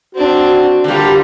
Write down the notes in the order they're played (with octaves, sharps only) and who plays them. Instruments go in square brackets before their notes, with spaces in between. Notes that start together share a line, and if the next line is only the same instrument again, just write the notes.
[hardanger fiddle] C4 D4 [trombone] F#4
[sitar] D3 G3 [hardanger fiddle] A#3 F4